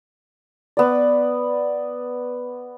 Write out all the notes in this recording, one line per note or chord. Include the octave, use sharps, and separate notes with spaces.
B3 D5